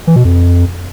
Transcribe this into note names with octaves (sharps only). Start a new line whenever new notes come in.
E3
B2
F2